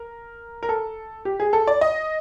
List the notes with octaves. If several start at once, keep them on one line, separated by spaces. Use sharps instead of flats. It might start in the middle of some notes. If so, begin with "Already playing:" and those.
Already playing: A#4
A#4
A4
G4
G#4
A4
D5
D#5